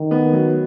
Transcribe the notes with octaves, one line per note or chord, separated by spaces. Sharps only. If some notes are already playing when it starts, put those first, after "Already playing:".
Already playing: D#3
B3
F#3